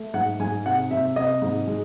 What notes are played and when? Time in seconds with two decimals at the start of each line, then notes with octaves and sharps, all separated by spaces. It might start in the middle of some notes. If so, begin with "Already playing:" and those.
Already playing: A3
0.14 G#2 F#5
0.40 G#2 G#5
0.66 C3 F#5
0.91 C3 E5
1.16 C3 D#5
1.42 G#2
1.67 G#3